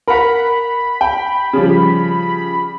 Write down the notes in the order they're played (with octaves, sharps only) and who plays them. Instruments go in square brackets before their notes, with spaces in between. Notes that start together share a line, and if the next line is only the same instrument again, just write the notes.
[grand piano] A#4 F#5 [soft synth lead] B5
[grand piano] G5
C#3 F3 G3